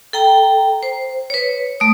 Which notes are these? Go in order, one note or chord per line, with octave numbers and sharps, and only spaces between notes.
A4 G5 A#5
C5
B4 C#5
A3 D#6